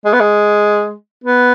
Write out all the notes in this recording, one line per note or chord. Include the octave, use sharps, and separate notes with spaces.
G#3
B3
G#3
B3